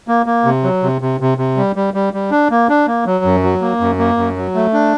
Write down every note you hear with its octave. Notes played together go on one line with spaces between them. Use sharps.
A#3
A#3
C3
F#3
C3
C3
C3
C3
G3
G3
G3
G3
D4
A#3
D4
A#3
F#3
F#2
F#3
A#3
F#2
A#3
F#2
F#3
A3
D4